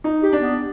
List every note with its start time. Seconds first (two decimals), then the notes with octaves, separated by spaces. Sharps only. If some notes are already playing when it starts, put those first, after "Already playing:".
0.04 D#4
0.23 G4
0.33 D4
0.42 B3